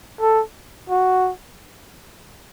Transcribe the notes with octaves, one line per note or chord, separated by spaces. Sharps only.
A4
F#4